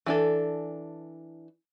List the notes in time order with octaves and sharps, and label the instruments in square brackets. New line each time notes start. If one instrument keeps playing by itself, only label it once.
[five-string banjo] E3 D4 A4